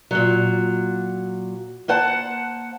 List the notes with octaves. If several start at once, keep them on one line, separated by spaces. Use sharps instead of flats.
A#2 F#3
A#3 C5 F#5 A5